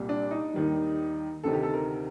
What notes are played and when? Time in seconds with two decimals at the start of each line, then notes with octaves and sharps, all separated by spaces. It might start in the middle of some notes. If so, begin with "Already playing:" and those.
Already playing: C2 A#2 G3
0.09 D4
0.31 D#4
0.53 D#2 D#3 G3
1.43 D2 C3 D#3 A4
1.53 G4
1.63 A4
1.73 A#4